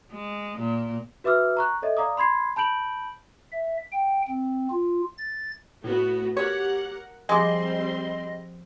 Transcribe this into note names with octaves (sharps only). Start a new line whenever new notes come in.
G#3
A#2
F#4 B4 E5 D6 E6 F6
A#5 C#6 F#6
A4 C#5 D#5 E5
D5 F5 A#5 D6 D#6
B5 C6 G#6 C7
A5 B5 G6 D7 F#7
E5
G5
C4
F4
A6
A2 A3 B3 F#4
G4 A#4 C#5 F#5
F3 G3 G#3 C4 D#5 C6 D6 A#6